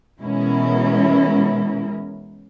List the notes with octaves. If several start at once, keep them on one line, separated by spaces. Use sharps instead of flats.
B2 E3 G#3 C#4 E4 A#4